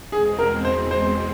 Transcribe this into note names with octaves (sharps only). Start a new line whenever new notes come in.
E2 B2 G#3 C4 G#4
A#4
C5
C5